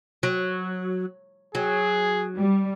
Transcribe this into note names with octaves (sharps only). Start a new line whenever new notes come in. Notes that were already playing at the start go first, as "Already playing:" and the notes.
F#3
F#3 G#4
G3